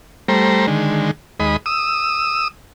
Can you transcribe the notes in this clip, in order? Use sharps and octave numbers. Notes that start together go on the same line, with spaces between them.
G3 A3 C5 A#5
D3 D#3 G#3
D#2 G#3 D#5 B5
D#6 E6